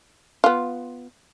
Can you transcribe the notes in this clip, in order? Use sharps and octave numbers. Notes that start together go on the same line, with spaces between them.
B3 F4